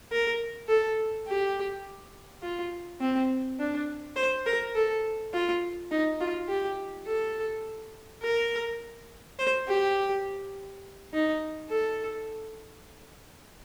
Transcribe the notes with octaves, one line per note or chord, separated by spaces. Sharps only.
A#4
A4
G4
F4
C4
D4
C5
A#4
A4
F4
D#4
F4
G4
A4
A#4
C5
G4
D#4
A4